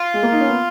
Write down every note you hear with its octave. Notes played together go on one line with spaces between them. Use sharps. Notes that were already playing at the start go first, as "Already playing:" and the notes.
Already playing: F4
G#3
A#3
D#4
C#4
B3